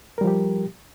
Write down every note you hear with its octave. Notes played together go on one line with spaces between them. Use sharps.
F3 G3 G4 A#4